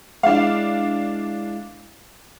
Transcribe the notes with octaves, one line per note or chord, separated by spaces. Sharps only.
G#3 D4 E4 F5